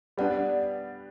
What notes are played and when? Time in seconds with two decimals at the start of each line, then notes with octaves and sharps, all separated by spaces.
0.18 G3 B3 D4 D5 F#5